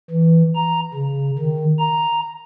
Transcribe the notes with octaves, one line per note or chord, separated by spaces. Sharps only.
E3
A#5
C#3
D#3
A#5